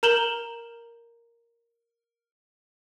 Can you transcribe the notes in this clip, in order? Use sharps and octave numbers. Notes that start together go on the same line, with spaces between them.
A#4 A#5 G6 E7 F#7 G7